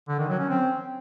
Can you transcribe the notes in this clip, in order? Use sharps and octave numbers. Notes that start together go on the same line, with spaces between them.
D3
D#3
F#3
C#4
C4